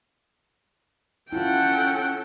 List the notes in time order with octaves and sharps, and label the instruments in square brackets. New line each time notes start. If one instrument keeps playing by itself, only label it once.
[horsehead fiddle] C#4 A4 [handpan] E4 F4 [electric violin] F#5 G5